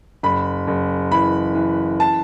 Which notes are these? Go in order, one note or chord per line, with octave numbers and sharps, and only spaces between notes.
F#1 B5
F#1
E3 B5
E3
A5